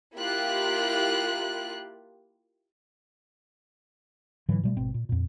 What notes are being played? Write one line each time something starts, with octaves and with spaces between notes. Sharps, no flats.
A#3 E4 F4 G4 F#6
G#2 D3 E3 F#3
B2 G3 A3
G#1 B2 C4
A#2
F2 A#2